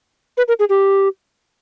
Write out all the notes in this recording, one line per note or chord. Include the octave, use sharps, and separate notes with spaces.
B4
A#4
G#4
G4